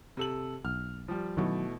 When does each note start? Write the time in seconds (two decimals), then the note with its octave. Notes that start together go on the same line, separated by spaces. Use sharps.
0.17 C3 A4 F#7
0.65 B1 F6
1.08 F3 G3
1.37 B2 D#3 E3 F#3 A3